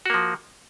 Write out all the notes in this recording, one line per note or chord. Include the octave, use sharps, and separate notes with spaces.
F3 A#3 F#4